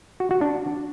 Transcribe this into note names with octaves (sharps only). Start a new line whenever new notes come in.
F#4
F#4
D4